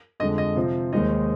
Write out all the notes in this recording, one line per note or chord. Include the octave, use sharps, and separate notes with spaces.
F2 D3 G#3 D#5
D#5
C3 F3 C4
D#2 D#3 G#3 C4 D#4 D#5